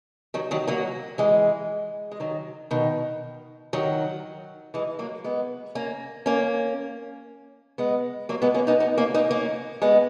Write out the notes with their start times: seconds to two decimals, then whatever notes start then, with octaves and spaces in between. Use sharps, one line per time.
0.34 D#3 F#3
0.51 D#3 F#3
0.67 F#3 A#3
1.18 E3 G#3
2.12 G#3
2.20 D#3 F#3
2.71 B2 D#3
3.73 D#3 F#3
4.74 E3 G#3
4.99 F#3 A#3
5.24 G#3 B3
5.75 A#3 C#4
6.26 A#3 C#4
7.78 G#3 B3
8.29 F#3 A#3
8.42 G#3 B3
8.54 A#3 C#4
8.67 B3 D#4
8.80 B3 D#4
8.98 A#3 C#4
9.14 B3 D#4
9.31 A#3 C#4
9.82 G#3 B3